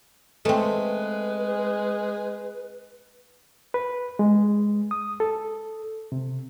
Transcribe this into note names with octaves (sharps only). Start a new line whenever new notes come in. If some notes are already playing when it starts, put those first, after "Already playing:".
G#3 A3 C4 B4
B4
G#3
D#6
A4
C3